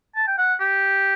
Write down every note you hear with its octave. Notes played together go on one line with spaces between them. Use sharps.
A5
G5
F#5
G4